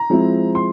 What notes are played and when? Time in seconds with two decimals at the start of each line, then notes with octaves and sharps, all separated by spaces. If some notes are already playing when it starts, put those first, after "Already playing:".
Already playing: A#5
0.10 F3 G#3 C4 E4
0.55 C6